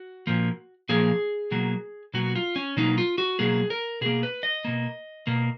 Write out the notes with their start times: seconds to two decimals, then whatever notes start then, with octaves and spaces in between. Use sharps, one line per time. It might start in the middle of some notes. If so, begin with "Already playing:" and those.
Already playing: F#4
0.27 A#2 F3 A#3
0.89 A#2 F3 A#3 G#4
1.51 B2 F#3 A#3
2.14 B2 F#3 A#3 F#4
2.35 F4
2.56 C#4
2.77 B2 F#3 A#3 D#4
2.98 F4
3.18 F#4
3.39 B2 F#3 A#3 G#4
3.70 A#4
4.01 B2 A#3 G#4
4.23 B4
4.43 D#5
4.65 B2 A#3
5.27 B2 A#3